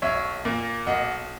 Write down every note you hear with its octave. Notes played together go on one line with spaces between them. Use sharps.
B1 C#5 E5
A#2 A#3
B1 D#5 F#5